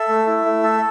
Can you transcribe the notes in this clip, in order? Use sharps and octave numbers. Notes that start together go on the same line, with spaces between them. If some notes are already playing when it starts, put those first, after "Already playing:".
Already playing: A4 E5
A3
E4
A3
A4